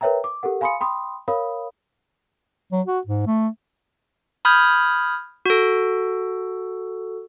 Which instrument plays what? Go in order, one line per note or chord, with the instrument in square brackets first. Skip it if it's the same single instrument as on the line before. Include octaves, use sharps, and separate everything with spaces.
[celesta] A#4 B4 C#5 E5 G5 A#5
D6
G4 A4 A#4 F#5
F5 G#5 B5 C6 D#6 C#7
G5 B5 C6 D#6
A#4 C#5 F5 B5 D#6
[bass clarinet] F#3
F#4
G#2
A3
[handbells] B5 D#6 F6 G6 G#6
F#4 A4